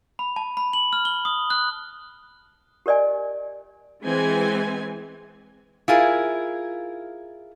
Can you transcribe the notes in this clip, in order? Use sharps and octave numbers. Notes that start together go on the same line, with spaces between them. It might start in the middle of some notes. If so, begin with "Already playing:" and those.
B5
A5
B5
F#7
F6
G7
D#6
F#6
G4 A#4 D5 D#5 G#5
E3 G#3 C4 G#5
E4 F4 G#4 A#4